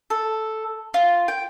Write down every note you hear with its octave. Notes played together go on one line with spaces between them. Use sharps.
A4
F4
G5